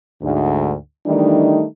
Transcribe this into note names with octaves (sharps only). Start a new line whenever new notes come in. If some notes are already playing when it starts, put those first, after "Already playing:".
D2 G#2
D#3 E3 G3 A3 D4 D#4